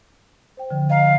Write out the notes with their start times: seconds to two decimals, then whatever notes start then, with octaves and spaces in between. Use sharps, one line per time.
0.57 C5 G5
0.70 D3 F3
0.90 D#5 F5 A#5